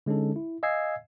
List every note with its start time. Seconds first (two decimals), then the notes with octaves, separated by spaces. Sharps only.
0.06 D3 G#3 C#4 D#4 A4
0.36 E4
0.63 D#5 F5 G#5 E6 G#6 C7